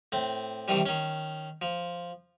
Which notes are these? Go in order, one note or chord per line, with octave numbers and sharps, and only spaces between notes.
A2 C4
C3 D#3 E3 G3
D#3 C#4
F3